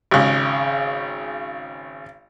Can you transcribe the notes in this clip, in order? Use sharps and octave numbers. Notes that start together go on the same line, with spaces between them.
G#1 C#3